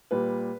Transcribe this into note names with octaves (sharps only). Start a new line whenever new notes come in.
A#2 G3 B4